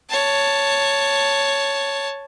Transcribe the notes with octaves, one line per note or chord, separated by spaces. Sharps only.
C#5 A5